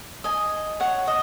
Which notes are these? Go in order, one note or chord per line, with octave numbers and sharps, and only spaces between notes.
D#5 G#5
C#5 F#5
D#5